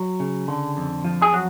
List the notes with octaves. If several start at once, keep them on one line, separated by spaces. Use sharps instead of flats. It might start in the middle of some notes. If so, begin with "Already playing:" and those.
Already playing: F#3
C#3
D3
F2
F3
G#4
F#3 F#4